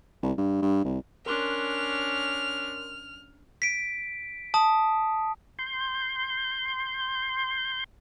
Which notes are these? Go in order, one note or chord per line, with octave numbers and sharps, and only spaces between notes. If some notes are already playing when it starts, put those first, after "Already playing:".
C2
G2
G2
C2
C#4 D4 A#4 C6 F6 F#6
B6 D7
A5 D#6
C6 G6